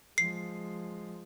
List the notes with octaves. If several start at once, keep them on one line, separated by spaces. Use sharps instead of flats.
F3 G#3 C7